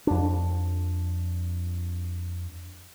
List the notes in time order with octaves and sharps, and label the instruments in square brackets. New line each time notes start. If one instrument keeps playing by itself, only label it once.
[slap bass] F2 D4